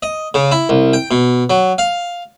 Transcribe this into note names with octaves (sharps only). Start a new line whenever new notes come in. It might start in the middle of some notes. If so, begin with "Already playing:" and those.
D#5
C#3
E4
C2
G5
B2
F#3
F5